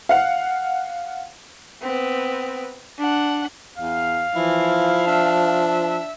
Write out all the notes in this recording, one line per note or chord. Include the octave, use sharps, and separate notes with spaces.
F5 F#5
B3 C4
D4 F#5
E2 F5
E3 F3 E4
D4 E5